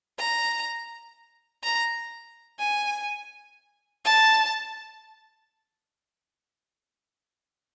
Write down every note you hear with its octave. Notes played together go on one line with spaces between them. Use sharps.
A#5
A#5
G#5
A5